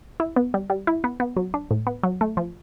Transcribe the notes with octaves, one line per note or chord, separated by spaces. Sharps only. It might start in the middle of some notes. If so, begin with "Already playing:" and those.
E4
B3
G3
G3
E4
B3
B3
F#3
D4
A2
B3
F#3
A3
F3